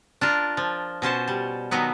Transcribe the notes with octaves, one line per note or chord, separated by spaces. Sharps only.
D4 F4 A#4
F3
B2 C#4 C5 A5
G3
B2 D#3 F#3 B3